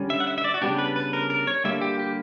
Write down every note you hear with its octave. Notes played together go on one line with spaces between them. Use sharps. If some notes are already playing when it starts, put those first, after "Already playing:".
Already playing: D3 G3 C#4
E5
F#5
E5
E5
D5
F#4
C#3 G3 B3 D4 G4
B4
B4
A#4
A#4
C#5
D3 G3 A#3 E5
G4
G4